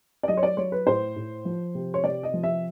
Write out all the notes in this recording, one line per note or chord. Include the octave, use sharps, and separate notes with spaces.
D5
F#3 D#5
C#5
D5
F#3 C#5
B4
A2 C5
A2
F3
C3
C#5
C3 D5
D#5
F3
E5